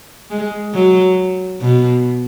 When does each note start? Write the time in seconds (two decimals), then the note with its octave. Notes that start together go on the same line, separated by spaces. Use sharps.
0.31 G#3
0.74 F#3
1.61 B2